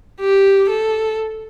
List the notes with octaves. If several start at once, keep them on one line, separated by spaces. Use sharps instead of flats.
G4
A4